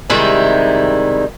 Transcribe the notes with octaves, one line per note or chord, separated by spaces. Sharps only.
C3 D#3 G3 G#3 E4 E5